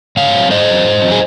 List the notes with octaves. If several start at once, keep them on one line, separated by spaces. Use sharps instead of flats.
G#2 C#5 F5
F#3 C4
G#2 C5 D#5
F#3 C4
G#2
F#3 C4
G#4